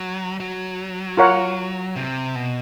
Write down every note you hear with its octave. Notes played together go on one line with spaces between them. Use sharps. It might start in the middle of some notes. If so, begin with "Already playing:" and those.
Already playing: F#3
F#3
F4 A#4 C#5 F#5
C3
B2